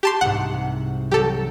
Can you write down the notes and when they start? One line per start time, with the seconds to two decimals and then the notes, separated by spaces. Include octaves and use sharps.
0.03 G4 A5 C6
0.21 C2 G#2 F#5
1.12 F#3 G4 A4